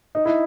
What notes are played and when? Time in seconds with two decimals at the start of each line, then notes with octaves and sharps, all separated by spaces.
0.15 D#4
0.25 E4